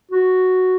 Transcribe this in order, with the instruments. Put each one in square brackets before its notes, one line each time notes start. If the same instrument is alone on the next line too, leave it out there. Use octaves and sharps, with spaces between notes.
[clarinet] F#4